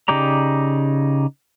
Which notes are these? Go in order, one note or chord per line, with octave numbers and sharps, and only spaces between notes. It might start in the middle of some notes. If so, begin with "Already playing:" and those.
C#3 D#4 G4 D5 A#5